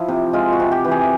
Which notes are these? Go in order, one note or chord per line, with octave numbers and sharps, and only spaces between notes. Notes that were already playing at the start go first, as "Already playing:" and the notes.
Already playing: F3 E4
C3
G#3 F4
F#4
C3
G4
E3
G#4